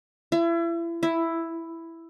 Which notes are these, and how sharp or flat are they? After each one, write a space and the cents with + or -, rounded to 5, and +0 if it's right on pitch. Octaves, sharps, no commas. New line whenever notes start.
E4 +35
E4 +5